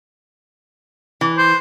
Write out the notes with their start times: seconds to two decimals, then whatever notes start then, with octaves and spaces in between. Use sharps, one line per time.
1.21 E3
1.38 C5